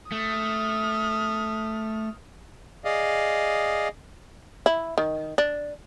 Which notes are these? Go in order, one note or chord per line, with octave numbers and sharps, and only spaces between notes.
A3 D#6 F6
G#4 D5 D#5 F5
E4
D#3
D4